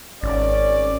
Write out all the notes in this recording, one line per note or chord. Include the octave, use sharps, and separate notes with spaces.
G#1 C#4 D5